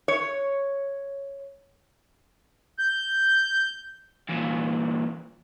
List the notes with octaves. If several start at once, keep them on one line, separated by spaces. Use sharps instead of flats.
C#5
G6
E2 A#2